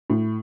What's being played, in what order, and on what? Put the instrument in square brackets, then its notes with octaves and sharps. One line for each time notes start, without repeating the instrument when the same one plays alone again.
[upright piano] A2